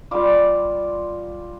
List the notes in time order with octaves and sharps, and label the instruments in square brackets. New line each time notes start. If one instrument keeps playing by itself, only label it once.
[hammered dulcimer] G3 F4 D6